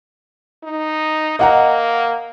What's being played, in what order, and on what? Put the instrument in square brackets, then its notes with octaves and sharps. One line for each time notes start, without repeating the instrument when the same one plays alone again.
[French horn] D#4
[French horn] A#3 [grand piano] D#5 F#5 A#5